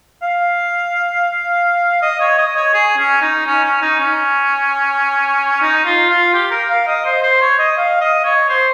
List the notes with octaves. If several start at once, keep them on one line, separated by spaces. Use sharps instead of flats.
F5
D#5
C#5
D#5
C#5
G#4
C#4
D#4
C#4
C#4
D#4
C#4
D#4
F4
F4
G4
A#4
F5
D#5
C5
C5
C#5
D#5
F5
D#5
C#5
C5